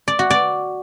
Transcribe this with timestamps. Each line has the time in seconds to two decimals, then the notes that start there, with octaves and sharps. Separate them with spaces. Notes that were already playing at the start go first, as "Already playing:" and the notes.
0.08 D5
0.19 F#4
0.30 D5